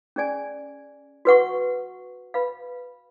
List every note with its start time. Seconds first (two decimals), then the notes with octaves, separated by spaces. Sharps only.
0.16 C#4 G#4 D5 G#5
1.25 F#4 B4 F#5 C#6
2.34 B4 F5 B5